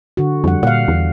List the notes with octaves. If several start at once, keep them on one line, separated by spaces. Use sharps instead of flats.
D3 F#4
F2 G3 F#5
A#2 F5 F#5
E2